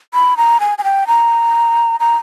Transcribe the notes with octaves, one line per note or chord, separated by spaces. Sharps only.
B5
A#5
G#5
G#5
G5
A#5
A#5